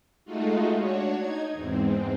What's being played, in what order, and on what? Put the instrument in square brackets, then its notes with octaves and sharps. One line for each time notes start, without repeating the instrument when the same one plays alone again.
[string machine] G#3 A3 D#4 F4 F#4
D4 F#4 C#5
D#4 G#6
E2 G#2 C4